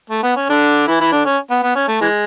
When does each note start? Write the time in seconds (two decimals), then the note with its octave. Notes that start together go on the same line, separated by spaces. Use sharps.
0.10 A3
0.23 B3
0.36 C#4
0.50 D3 D4
0.88 E3 E4
1.00 E3 E4
1.12 D3 D4
1.26 C#4
1.51 B3
1.63 B3
1.76 C#4
1.88 A3
2.01 E3 G#3